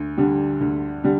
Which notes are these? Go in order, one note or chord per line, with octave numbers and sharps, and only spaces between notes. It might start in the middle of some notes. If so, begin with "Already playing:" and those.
Already playing: D2
D3 G3
D2
D3 G3